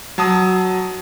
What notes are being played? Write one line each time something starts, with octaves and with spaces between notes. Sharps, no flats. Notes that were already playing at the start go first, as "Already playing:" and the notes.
F#3 A5 D#6